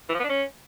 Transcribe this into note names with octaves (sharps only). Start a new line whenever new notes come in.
E3
F3
B3
D4
C#4